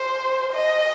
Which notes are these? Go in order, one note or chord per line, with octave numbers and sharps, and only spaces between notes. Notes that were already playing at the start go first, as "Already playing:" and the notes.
Already playing: C5
D#5